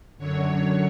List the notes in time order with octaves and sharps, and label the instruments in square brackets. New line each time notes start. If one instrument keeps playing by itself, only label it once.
[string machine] F#2 D3 F#3 C#5